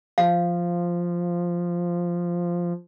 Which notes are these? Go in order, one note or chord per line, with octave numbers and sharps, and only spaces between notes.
F3 F5